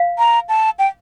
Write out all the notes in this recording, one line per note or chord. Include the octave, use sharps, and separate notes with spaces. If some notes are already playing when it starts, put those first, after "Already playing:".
Already playing: F5
A#5
A5
G5